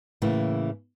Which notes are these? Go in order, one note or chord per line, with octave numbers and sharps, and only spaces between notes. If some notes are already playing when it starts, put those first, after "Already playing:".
A2 C#3 E3 A#3